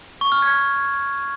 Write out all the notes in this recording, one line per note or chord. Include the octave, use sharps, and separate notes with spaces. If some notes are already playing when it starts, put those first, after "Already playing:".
C#6
F6
G#6